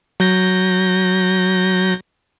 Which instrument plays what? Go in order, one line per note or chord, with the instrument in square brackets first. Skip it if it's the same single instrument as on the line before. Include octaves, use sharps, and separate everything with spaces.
[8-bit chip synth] F#3 G6 A#6